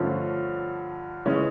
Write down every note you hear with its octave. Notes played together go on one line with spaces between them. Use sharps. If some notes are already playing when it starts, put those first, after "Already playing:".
Already playing: G2 D3 F3 A3 C#4
C#3 E3 G#3 C#4